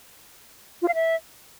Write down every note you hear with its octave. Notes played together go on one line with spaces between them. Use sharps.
F4
F5
E5